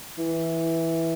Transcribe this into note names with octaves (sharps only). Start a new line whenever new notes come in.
E3